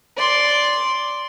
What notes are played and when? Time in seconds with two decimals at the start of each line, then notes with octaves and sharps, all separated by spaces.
0.17 D5 C6